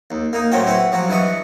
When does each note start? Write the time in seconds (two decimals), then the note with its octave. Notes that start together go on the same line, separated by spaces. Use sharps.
0.11 D#2
0.33 A#3 D#4
0.52 F#2 A2 C4 C#4 F#4 G5
0.65 C4 E4 F#4 B4
0.92 F3 F#3 F#4
1.09 G2 E3 B4 D#5 C#6